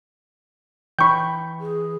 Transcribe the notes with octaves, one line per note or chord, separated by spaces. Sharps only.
E3 G5 B5 C#6 G6
G#4